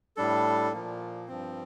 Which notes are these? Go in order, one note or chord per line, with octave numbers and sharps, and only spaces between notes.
A2 G3 D4 A4
A#2 F3 A#3
G2 F3 C4